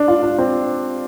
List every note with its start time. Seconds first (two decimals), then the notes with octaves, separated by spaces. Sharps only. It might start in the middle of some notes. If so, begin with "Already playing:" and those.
Already playing: D4
0.08 F4
0.23 D4
0.38 C4